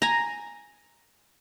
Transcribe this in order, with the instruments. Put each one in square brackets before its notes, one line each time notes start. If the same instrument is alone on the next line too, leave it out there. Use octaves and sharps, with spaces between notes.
[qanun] G#5 A#5